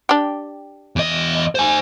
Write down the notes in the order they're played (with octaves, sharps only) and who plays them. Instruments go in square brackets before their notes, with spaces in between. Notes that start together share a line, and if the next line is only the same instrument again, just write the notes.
[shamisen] D4 G4
[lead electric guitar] E2 D#5
C5 G#5